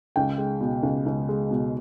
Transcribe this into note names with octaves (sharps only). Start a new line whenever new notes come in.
C#2 G5
G#3
B2
C#2
C#2
G#3
B2